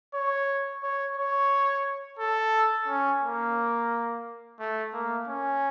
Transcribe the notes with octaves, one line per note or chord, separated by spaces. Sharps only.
C#5
C#5
C#5
A4
C#4
A#3
A3
A#3
C#4